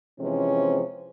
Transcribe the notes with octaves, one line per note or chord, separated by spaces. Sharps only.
C3 E3 F3 G#3 C4 C#4